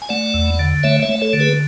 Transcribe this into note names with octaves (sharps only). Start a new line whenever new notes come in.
G#5
A3 D5 F#5
E2
D3
A3 C#5 E5
C#5 E5
A3
A4 C#5
D3
G#4 B4